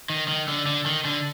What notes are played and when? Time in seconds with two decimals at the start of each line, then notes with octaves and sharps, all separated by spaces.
0.10 D#3
0.28 D#3
0.48 D3
0.67 D3
0.86 D#3
1.05 D3